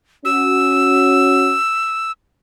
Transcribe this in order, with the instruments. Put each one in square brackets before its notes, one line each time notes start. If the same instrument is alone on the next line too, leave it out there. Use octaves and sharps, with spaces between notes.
[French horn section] C#4 F#4 [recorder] E6